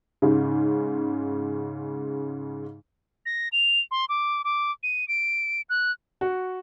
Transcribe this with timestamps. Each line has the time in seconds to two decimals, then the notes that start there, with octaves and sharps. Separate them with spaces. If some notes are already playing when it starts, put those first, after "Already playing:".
0.22 G#2 C#3
3.26 A#6
3.52 F7
3.91 C6
4.09 D6
4.44 D6
4.83 D#7
5.08 D7
5.70 F#6
6.21 F#4